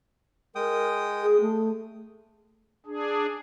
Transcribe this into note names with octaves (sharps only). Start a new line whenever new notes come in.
G#3 A#4 G5 D#6
G#4
A3
D4 G#4